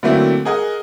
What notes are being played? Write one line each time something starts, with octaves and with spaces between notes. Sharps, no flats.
D3 F#3 A3 A#3 C4 E4
G#4 A#4 D#5 F#5 G#5